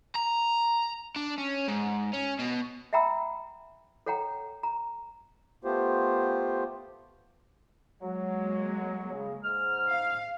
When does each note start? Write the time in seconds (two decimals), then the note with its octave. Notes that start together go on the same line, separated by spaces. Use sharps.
0.16 A#5
1.16 D4
1.38 C#4
1.68 G#2
2.13 C#4
2.39 B2
2.93 E5 F#5 G5 A#5 B5 E6
4.06 A4 C#5 F#5 G5 A#5
4.63 A#5
5.64 A3 B3 F4 G4 C5
8.02 F#3 G#3 A#3
9.11 C#3
9.43 G#2 F6
9.89 F5